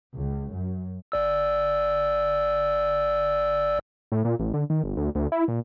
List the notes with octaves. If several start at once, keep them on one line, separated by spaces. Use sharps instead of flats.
C#2
F#2
G1 D5 E6
A2
A#2
A1
D3
D#3
G1
D2
D2
E4
A#2